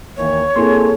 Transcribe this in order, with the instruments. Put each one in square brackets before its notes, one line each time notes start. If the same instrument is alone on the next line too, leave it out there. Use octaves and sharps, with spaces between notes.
[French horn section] D#2 E3 A#3 [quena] C#5
[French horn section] G2 G#4 A4 [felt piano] A#3 C4 [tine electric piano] E4 C6